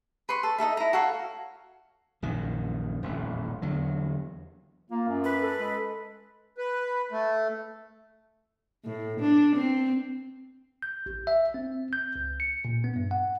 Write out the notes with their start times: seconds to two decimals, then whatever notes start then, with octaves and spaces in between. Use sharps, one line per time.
0.29 B4 C6 C#6
0.43 A4
0.58 D#4 E4 A4 E5
0.77 E4 A#5
0.93 F#4 A4 C#5 F5
2.22 A#1 F#2 D#3
3.02 D#1 A1 F2
3.62 E2 D3 F#3
4.90 A#3 F4
5.08 F#2
5.24 B4
5.41 A4
5.58 G#3
6.58 B4
7.12 A3
8.85 A2
9.20 D4
9.56 C4
10.82 G6
11.06 A1
11.27 E5
11.54 C4
11.93 G6
12.16 C#2
12.40 C#7
12.65 A#2
12.84 B3
12.96 G2
13.11 F#5